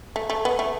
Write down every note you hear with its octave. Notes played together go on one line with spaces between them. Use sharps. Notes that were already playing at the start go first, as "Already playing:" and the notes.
A3
A3
B3
A3